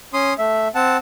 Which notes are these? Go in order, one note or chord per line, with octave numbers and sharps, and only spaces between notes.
C#4 C6 D#6
A3 E5
C4 F#5 A5